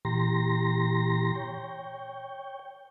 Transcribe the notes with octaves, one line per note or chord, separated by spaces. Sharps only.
A#2 E3 G4 A#5 C6 A#6
C#5 G5